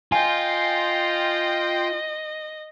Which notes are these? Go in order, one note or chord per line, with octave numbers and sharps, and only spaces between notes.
F4 D#5 G5 G#5 C6